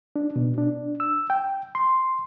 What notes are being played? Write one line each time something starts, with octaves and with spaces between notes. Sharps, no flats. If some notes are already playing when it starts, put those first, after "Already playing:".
D4
B2
D4
E6
G5
C6